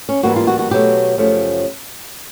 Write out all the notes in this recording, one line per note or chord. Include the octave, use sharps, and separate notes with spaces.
C#4
G#2 E3 G3 A#3 F#4
F4
F#4
F#4
B2 F#3 A3 G4
F#2 C#3 F3 A3